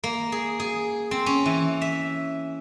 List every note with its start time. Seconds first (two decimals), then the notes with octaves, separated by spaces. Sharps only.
0.04 A#3
0.32 G#4
0.60 G#4
1.11 C4
1.26 C#4
1.46 E3
1.82 E5